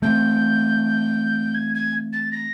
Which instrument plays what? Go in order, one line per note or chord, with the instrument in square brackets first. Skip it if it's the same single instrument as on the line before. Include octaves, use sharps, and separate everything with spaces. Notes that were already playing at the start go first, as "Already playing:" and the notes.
[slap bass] E3 A3 C4 [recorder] G6
[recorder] G#6
G#6
A6
A#6